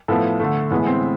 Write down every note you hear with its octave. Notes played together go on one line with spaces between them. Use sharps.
A2 F3 B3 A4
D3 A3
A2 E3 G#3 B3
C4